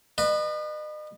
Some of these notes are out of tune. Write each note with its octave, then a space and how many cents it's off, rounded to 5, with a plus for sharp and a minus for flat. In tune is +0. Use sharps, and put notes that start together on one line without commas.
B4 +0 D#5 -40